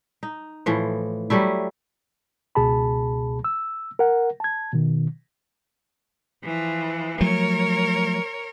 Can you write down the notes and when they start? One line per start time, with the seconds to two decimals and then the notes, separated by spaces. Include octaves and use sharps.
0.23 D#4
0.66 A2 E3 F3
1.30 F#3 G3 A3 E4
2.55 C#2 B2 G#4 A5 B5
3.44 E6
3.99 A#4 F#5
4.40 A5 G#6
4.73 B2 D#3
6.44 E3 F3
7.21 F3 F#3 A3 A#4 C#5